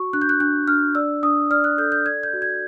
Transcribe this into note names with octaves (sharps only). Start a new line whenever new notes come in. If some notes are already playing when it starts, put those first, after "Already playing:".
Already playing: F#4 C#6
D4 F#6
G6
F#6
D4 F#6
D4 F6
D5 E6
D4 D#6
D5 F6
F#6
A4 G6
G6
D5 G#6
G6
F#4
G#6